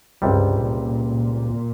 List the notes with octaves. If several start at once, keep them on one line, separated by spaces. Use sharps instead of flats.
C#2 G2 C3 G3
A#2